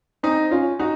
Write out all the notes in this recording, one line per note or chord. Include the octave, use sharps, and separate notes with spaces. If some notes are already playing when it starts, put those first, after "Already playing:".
C4 D#4
C#4 F4
D#4 F#4